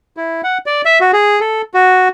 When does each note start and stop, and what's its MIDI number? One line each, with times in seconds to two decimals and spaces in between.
0.17 0.41 64
0.44 0.58 78
0.66 0.82 74
0.85 0.99 76
1.01 1.11 66
1.13 1.40 68
1.40 1.62 69
1.74 2.08 66